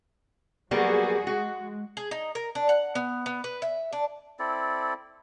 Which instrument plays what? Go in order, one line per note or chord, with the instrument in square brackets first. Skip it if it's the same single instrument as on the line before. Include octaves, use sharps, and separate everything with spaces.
[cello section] F#3 F#4 G#4 [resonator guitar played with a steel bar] G3 A#3 B3
[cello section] G#3 [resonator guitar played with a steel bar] F#4
[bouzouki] G#4
D#4
A#4
D4
F#5
B3
B3
B4
E5
D4
[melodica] C4 E4 A4 D5